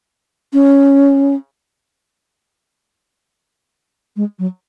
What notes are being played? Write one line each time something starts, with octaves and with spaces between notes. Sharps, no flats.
C#4
G#3
F#3